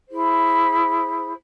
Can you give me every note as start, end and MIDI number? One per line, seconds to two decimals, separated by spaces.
0.11 1.33 64
0.11 1.33 68
0.11 1.33 72